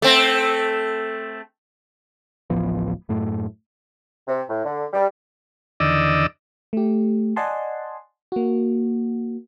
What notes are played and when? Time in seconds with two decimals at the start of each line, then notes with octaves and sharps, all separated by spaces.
0.02 A3 C4
2.50 D1 A1 F3 B3
3.09 F#2 A2 A3
4.28 C3
4.50 A2
4.65 D3
4.93 G3
5.80 E2 D3 D#3 D5 D#5 E6
6.73 A3 G4
7.36 D5 D#5 F#5 G#5 A5 C6
8.32 A#3 F#4